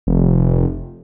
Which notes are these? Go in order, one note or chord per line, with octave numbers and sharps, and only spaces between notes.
F1